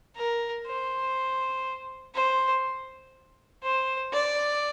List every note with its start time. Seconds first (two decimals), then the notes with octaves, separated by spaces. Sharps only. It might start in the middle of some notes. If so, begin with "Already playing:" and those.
0.16 A#4
0.66 C5
2.15 C5
3.64 C5
4.14 D5